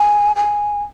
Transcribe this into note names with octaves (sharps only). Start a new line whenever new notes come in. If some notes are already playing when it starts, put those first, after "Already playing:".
Already playing: G#5
G#5